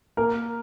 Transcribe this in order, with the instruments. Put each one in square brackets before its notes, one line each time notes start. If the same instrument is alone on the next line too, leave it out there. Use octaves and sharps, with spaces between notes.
[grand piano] A#3 [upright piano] A#4